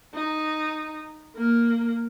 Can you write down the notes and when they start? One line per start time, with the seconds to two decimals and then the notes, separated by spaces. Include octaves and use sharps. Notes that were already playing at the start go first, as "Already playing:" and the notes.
0.14 D#4
1.36 A#3